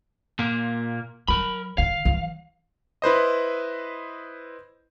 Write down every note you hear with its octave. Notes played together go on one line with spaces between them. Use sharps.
A#2 A#3
F#3 A#4 B5
D#3 F5
E3 F#3
E4 B4 C5 D#5